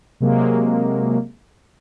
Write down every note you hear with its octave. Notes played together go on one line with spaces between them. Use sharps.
C3 F#3 G#3 A#3